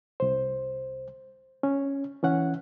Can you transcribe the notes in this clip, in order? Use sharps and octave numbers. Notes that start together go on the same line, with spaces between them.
C2 C5
C#4
E3 C#4 F#5